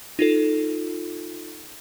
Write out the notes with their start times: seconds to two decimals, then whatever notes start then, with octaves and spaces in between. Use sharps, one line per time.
0.19 D#4 F4 A4